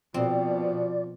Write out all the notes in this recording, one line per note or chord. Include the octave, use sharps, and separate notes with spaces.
B2 F3 C4 D5